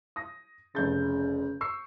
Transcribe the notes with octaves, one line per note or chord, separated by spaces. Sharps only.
D#6 A#6
F1 C#3 G6 A6
C#6 E6 C7